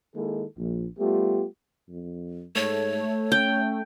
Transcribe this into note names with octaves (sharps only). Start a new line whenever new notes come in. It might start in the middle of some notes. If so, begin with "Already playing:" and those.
D#3 G#3 A#3 E4 G#4 A4
A#1
G3 A3 B3 F4 G4
F2
G#2 A3 C#5
C#4 G5